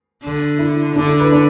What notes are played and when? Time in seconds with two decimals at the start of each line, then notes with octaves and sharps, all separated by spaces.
0.23 D3
0.59 E4
0.96 D3 D4
1.08 E4
1.20 B4
1.32 D4